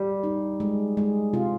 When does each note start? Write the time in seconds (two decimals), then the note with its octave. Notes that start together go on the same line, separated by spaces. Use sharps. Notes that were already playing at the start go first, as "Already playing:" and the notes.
Already playing: G3
0.23 D#4
0.60 G#3
0.97 G#3
1.33 C3 F4